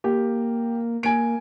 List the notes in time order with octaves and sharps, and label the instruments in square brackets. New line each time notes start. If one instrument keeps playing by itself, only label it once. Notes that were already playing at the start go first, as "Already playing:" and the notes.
[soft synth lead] A#3 [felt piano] G4
[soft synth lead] A#3 [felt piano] G#5 D7